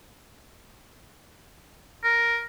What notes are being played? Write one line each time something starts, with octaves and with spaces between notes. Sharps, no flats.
A#4